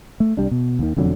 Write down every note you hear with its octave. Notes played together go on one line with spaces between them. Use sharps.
A3
C2 G3 D4
B2
D#2 D#3
E1 F2 D3 F#3